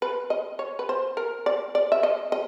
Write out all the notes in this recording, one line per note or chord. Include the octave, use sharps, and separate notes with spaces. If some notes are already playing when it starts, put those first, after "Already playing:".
B4
D#5
C#5
B4
C5
A#4
D5
D5
E5
D#5
D#5